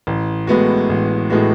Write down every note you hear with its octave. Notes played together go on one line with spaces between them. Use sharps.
A1
A2 G#3 B3 F#4
A1
A2 G#3 B3 F#4